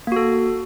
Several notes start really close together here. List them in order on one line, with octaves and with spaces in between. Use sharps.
A#3 F#4 A4